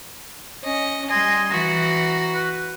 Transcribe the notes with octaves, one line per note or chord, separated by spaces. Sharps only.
C#4 D#5
G3 D#5 G#5 C6
E3 F#4 A#5
B4